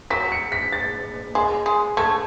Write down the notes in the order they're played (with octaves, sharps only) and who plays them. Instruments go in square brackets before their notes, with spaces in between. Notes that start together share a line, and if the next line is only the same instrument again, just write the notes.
[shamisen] F#3 [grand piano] B6
[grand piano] C#7
B6
A6
[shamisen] G#3
G#3
[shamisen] A3 [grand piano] G#6